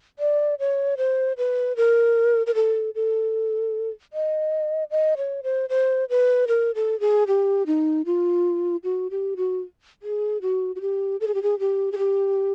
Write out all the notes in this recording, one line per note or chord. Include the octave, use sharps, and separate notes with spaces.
D5
C#5
C5
B4
A#4
A#4
A4
A4
D#5
D#5
C#5
C5
C5
B4
A#4
A4
G#4
G4
D#4
F4
F#4
G4
F#4
G#4
F#4
F#4
G4
A4
G#4
G4
G#4
G4
G#4
G4